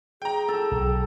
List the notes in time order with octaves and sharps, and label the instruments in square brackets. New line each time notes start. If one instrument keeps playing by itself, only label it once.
[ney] G#4 [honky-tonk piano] G5 A#5
[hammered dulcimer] A4
[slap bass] B1 F#3